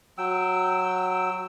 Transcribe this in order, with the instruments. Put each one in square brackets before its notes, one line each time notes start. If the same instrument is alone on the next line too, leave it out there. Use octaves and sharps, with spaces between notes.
[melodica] F#3 G5 E6